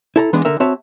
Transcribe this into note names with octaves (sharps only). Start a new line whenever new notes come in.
E4 A4 A#5
E3 G#3 B3 D4
D3 A#4 E5
C4 F#4 C#5 E5 A5